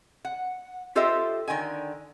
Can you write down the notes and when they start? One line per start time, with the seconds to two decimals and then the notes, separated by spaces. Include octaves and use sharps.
0.25 F#5
0.95 F4 G4 A4 C5 D#5 E5
1.48 D3 D#3 G5 G#5